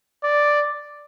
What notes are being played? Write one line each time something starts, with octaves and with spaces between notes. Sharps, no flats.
D5